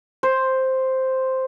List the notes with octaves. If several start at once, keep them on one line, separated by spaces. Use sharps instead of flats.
C5